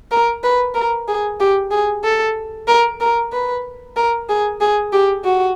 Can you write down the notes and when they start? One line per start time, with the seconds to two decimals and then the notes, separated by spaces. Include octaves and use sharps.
0.11 A#4
0.43 B4
0.74 A#4
1.08 G#4
1.40 G4
1.71 G#4
2.04 A4
2.68 A#4
3.00 A#4
3.32 B4
3.96 A#4
4.29 G#4
4.61 G#4
4.92 G4
5.24 F#4